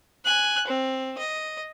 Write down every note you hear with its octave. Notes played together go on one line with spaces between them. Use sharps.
G#5 F#6
C4
D#5